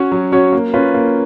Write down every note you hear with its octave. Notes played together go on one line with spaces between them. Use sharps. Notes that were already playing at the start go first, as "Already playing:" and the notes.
Already playing: C#4 F#4 C#5
F#3
C#4 F#4 C#5
A#3
C#4 F4 B4
A#3